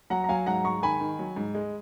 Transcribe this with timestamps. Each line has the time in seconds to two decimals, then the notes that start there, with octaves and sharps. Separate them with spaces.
0.10 F#3 F#5 A#5
0.24 A#5
0.29 F#3 F5 G#5
0.46 G#2 F#5 A#5
0.64 G#2 A#5 C#6
0.82 D#3 G#5 B5
1.00 D#3
1.19 F#3
1.36 G#2
1.55 G#3